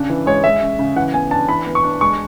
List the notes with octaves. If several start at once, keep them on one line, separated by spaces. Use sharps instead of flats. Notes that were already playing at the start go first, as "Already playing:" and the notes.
Already playing: C#3 D4
E3
G#3 C#5
G#3 E5
C#4
C#3
E3 F#5
B3 G#5
D4 A5
E3 B5
B3
C#6
D4
G#3 C#6